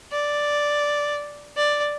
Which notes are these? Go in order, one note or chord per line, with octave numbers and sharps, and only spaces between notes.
D5
D5